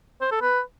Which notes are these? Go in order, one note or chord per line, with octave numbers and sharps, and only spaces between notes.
C5
A4
B4